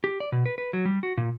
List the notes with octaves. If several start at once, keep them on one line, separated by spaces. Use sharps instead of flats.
G4
D5
B2
B4
B4
F#3
G3
F#4
A#2